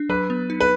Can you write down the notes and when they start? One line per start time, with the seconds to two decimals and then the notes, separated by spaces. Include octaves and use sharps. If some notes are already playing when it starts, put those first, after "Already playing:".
Already playing: D4
0.09 F#3 B4
0.30 B3
0.50 D#4
0.60 B4